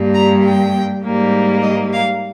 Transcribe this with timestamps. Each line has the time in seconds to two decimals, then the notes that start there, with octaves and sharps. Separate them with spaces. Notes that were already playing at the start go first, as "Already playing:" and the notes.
Already playing: G2 G3 A#3
0.14 A#5
0.44 G5
1.03 G#2 G3 A#3
1.62 D#5
1.92 F5